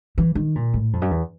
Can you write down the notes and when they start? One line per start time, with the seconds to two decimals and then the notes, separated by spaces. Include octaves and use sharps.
0.18 E3
0.35 D#3
0.55 A#2
0.74 A2
0.93 F2
1.01 F#2
1.11 E2